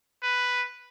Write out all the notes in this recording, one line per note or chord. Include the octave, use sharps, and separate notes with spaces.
B4